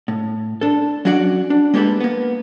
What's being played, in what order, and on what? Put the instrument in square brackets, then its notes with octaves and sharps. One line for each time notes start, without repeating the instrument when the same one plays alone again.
[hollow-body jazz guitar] A2
D4 A4
F#3 C#4 D4 F#4 D5 F#5
D4
G#3 A#3 B3 G4 A4 B5
A#3 B3